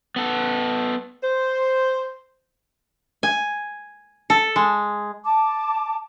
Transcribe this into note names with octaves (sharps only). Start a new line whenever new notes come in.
B3 A4
C5
G#5
A4
G#3
A5 D6